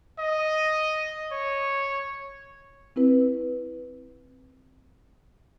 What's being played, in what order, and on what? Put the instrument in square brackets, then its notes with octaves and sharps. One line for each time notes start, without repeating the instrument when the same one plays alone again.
[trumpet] D#5
C#5
[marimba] C4 E4 B4